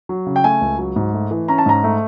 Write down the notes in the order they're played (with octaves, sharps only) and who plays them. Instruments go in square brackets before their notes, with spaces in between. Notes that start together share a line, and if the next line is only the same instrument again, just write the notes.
[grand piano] F#3
C#3
G5
A3 G#5
C#2
F#3
G#2
A3
E3
C#4 A#5
A5
G#2 A#5
A3